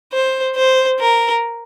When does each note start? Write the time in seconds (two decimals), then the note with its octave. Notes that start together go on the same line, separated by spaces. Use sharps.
0.13 C5
0.56 C5
1.00 A#4